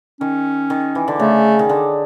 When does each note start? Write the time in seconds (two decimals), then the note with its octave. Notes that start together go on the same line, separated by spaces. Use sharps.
0.20 D#3 C#4
0.70 D#3
0.95 E3
1.08 D3
1.19 C#3 A3
1.59 D#3
1.69 D3